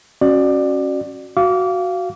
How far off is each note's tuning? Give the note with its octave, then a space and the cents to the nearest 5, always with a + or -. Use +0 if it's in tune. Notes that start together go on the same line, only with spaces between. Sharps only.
C#4 -20 F#4 +0 D5 +20
F#4 +0 F5 -15 D6 -30